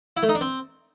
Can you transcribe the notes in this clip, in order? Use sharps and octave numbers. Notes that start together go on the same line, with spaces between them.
E4
A3
D#4
D4
C4